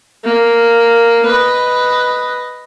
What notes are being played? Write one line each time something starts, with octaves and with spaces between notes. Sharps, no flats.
A#3
B4 D#5